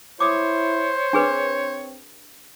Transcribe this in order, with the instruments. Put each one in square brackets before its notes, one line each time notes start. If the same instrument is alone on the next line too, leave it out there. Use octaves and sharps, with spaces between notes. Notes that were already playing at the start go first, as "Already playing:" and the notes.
[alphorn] E4 [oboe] C5 [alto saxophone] C#5 [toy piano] D6 D#6
[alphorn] C4 [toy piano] D4 G#4 B4